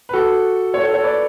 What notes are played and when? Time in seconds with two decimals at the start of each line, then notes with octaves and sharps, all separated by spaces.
0.09 B4
0.13 F#4 A4
0.73 A4 C#5
0.84 A4 C#5
0.94 A4 C#5
1.04 B4 D5